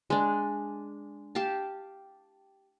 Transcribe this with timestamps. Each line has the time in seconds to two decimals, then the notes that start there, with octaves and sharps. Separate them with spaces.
0.10 G#3 D4
1.35 G4 F5 A5